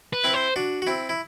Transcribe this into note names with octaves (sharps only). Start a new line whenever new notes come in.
B4
C4 E4
C5
D4 F#4
F#4
C4 E4
E4